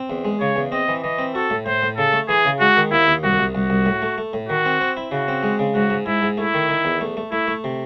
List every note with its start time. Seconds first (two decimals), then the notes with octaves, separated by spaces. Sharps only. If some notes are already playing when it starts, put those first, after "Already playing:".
Already playing: C4
0.10 E2
0.25 G#3
0.40 C#3 C#5
0.56 E2
0.72 C4 D#5
0.88 E3
1.03 E3 D#5
1.18 C4
1.35 F#4 A4
1.50 A2
1.66 A2 C5
1.82 A2
1.98 C#3 A4
2.13 A3
2.29 E3 G#4
2.45 C#3
2.60 G#3 F#4
2.77 D#3
2.92 D#2 E4
3.07 D#2
3.24 C2 F#4
3.39 C2
3.55 C2 F#4
3.70 C2
3.86 A2
4.02 A3
4.18 A3
4.33 A2
4.49 D#3 F#4
4.65 C4
4.81 C4
4.97 E4
5.11 C#3 F#4
5.28 C4
5.43 G#3
5.59 C#3
5.75 G#2 F#4
5.90 G#2
6.06 G#2 E4
6.22 G#2
6.37 A3 E4
6.54 D#3
6.69 D#3
6.85 E2
7.01 A3
7.17 A3
7.32 A3 E4
7.47 A3
7.64 C3